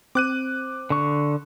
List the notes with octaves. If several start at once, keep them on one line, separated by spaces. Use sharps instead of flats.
C4 D6 F#6 D#7
D3 C#6